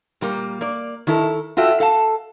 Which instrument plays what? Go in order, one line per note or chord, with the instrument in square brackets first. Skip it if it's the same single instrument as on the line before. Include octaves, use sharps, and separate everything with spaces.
[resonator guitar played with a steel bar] A#2 G3 A#3
A#3 D5
D#3 F#3 E4 A4 A#4
F4 F#4 A4 E5 G5
A4 F5 F#5 A5